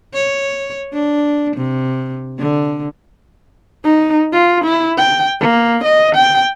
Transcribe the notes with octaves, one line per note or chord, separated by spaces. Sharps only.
C#5
D4
C3
D3
D#4
F4
E4
G5
A#3
D#5
G5